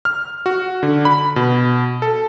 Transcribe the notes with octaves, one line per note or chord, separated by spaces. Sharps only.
F6
F#4
D3
B5
B2
A4